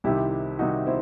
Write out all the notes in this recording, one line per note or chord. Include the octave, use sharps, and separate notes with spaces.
C2 C3 D#3 E4 G4
C2 C3 D#3 D#4 F#4
C4 E4